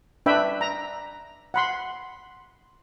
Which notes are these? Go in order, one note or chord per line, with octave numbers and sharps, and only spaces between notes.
D4 B4 E5 G5 B5
A#5
F#5 B5 C6